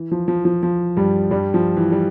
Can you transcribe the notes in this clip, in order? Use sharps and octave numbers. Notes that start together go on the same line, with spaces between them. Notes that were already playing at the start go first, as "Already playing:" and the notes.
Already playing: E3
F3
F3
F3
F3
G2 G3
G2 G3
F3
E3
G3